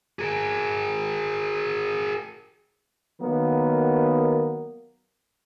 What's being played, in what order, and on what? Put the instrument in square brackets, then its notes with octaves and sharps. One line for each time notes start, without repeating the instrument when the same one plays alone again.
[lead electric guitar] G#4 A#4
[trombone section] D#3 F#3 A#3 B3 A#4